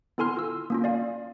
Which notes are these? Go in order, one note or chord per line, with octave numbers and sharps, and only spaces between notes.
B3 E4 A4 G#5 C6 F6
F4 E6
A#3 C#4 F4
D5 F5 G#5